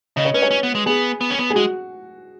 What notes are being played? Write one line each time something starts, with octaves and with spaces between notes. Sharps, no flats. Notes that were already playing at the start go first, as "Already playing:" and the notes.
C#3 D#5
C#5
C#4 B4
C#5
C#4
B3
G#3
B3 G#4
B3
C#4
B3
G#4
G#3 F#4